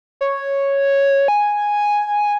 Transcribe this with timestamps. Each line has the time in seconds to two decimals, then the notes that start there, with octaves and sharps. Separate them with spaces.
0.21 C#5
1.28 G#5